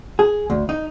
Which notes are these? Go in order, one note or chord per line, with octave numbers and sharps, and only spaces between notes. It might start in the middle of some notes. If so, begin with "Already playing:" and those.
G#4
D2
D#4